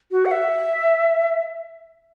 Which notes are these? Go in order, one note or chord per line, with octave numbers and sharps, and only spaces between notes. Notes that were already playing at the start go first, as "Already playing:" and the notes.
F#4
F#5
E5